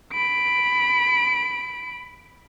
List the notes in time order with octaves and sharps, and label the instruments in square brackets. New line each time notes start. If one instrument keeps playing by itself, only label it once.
[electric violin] B5 D7